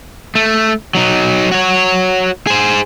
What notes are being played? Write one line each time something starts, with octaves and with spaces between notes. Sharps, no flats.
A3
F#3 D#4
F#4 C#5
G#4 C5